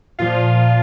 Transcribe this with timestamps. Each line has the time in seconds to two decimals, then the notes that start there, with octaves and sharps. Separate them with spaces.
0.19 A#2 F3 F4